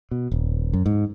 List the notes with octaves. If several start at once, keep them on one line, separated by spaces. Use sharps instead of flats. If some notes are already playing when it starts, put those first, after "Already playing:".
B2
D#1
F#2
G#2